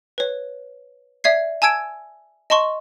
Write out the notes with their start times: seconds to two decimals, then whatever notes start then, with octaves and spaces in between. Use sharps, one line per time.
0.18 B4 C#5
1.24 D5 E5 G#6 C7
1.62 G#5 A5 E6 G#6 D7
2.50 D#5 A5 C6 C#6